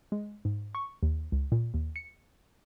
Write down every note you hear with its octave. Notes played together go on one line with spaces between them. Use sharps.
G#3
G#2
C#6
D#2
C#2
A#2
D#2
C#7